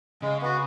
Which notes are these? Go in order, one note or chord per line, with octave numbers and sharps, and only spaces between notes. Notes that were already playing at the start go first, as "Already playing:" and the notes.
C#3 G#3
B3 F#4